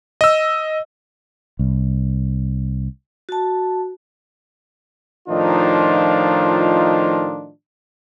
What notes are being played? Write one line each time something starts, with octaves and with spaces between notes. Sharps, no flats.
D#5 E6
C2
F#4 A5
A2 D#3 F3 D4 D#4 F4